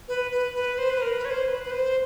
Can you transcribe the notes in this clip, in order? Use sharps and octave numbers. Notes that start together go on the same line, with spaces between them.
B4
B4
B4
C5
B4
A#4
B4
C#5
C5
B4
B4
C5